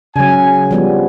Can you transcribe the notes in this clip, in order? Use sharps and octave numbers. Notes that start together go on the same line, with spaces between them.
C#3 F#3 G#5
F3 G3 B3